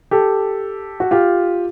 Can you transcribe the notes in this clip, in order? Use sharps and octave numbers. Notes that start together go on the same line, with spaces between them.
G4 A4
F#4
F4 G4